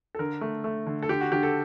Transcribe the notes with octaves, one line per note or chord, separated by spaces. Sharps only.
A4
D3 A#4
A3
A3
D3
A4
D3 G4
F#4
D3 G4
A4